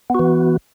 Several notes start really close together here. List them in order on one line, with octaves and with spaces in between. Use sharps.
B3 F#4 E3